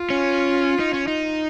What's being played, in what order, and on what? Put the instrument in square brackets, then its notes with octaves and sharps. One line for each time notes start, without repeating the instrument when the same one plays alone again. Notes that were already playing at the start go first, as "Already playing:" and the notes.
Already playing: [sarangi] F4
[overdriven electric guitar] C#4
D#4
C#4
D#4